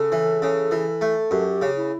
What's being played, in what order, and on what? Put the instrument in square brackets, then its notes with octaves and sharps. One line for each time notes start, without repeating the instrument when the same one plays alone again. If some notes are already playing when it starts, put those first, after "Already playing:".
Already playing: [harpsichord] C#3 [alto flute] A4
[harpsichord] E3
C#3
E3
A3
[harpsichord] F#2 [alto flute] G4
[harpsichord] C#3
[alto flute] E4